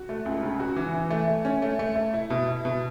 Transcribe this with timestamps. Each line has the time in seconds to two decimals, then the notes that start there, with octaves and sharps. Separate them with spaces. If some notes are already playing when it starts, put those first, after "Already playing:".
Already playing: F#4
0.09 A3
0.26 C#2
0.43 C#3
0.60 F#4
0.76 E3
0.94 E3
1.10 A3
1.28 A3
1.45 C#4
1.62 A3
1.79 A3
1.96 A3
2.14 E4
2.30 B2
2.48 E4
2.65 B2